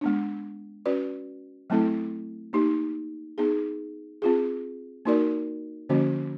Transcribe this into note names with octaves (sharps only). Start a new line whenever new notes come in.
G#3 B3 D4
C#4 F#4 B4 D5
F#3 A3 C4 E4 A4
A#3 D#4 G4
B3 D#4 G#4
C4 F4 G#4
A#3 D#4 F#4 A#4 D5
D3 F3 A#3 C#4 F#4